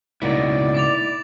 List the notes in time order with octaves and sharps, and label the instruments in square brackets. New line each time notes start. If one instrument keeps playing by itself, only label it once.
[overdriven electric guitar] C#2 B2 [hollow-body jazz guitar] A#3 D#4 E4 [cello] D5
[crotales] D6 A6 F7